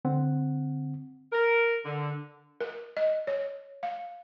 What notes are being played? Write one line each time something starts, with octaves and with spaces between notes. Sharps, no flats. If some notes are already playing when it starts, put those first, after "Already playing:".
D3 C4 F#5
A#4
D3
A#4
D#5
C#5
F5